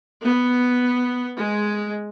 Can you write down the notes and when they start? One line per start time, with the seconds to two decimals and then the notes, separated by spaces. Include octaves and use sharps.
0.23 B3
1.38 G#3